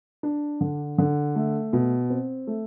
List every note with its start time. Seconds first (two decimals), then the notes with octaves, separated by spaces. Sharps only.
0.23 D4
0.61 D3
0.98 D3
1.36 A3
1.73 B2
2.10 C4
2.47 A3